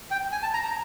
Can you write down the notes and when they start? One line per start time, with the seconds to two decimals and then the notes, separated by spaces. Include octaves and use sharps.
0.11 G5
0.32 G#5
0.43 A5
0.54 A#5
0.64 A#5